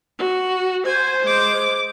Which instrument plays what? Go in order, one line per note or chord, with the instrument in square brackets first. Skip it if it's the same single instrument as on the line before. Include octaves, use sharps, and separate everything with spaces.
[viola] F#4
[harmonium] C5 [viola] G#5
[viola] G#3 D6